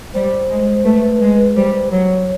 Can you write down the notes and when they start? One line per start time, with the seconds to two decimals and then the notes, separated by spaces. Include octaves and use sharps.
0.14 G3 C5
0.50 G#3
0.85 A3 B4
1.21 G#3
1.56 G3 C5
1.91 F#3 C#5